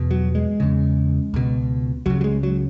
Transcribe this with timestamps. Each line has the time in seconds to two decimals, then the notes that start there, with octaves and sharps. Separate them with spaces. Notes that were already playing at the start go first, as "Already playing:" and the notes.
Already playing: E2 B2
0.11 F#3
0.35 G#3
0.60 E2 C#3
1.34 C#2 B2
2.06 C#2 C#3 F#3
2.21 F#3
2.24 G#3
2.43 F#3